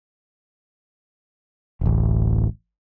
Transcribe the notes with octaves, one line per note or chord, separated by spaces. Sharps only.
D1 A1